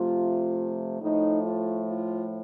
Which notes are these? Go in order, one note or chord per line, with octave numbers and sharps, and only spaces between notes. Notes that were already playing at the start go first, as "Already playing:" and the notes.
Already playing: C3 F3 A3 F4
A2 F3 A3 D#4
F4
F4